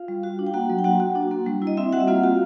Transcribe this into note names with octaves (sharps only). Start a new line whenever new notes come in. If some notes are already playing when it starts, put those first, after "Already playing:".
Already playing: F4 F5
G3
F#4
D4
G5
A#3 F#4 F#5
F#3
G5
A#3 F#4 F#5
F#4
D4
A#3
G3
E4
D#5
C4 E4 E5
G3 F#4 F#5
E5
A#3 F4 F5
F#4